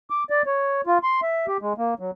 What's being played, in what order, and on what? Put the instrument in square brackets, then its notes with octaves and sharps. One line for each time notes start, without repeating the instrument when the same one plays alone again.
[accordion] D6
D5
C#5
F4
C6
E5
G4
G#3
A#3
F#3